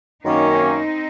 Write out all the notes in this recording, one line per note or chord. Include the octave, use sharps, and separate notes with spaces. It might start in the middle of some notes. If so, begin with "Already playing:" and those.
F#2 D#3 A#3 C4 C#4 D#4